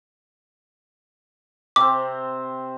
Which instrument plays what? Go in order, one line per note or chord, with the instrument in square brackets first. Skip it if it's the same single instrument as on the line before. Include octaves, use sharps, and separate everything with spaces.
[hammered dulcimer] C3 C4 [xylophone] D6